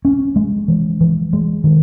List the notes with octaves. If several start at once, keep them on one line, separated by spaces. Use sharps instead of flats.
C#4
G#3
E3
E3
G#3
D#3